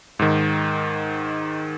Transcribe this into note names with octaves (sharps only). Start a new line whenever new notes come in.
G#2 D#3